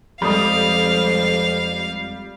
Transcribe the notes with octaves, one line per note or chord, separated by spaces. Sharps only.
F2 G3 G#3 A4 F5 B5 D#6